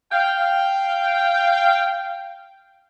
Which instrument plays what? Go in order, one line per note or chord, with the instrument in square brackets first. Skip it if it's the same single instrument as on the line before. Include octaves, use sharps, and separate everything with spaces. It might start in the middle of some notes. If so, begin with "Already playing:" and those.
[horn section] F5 G5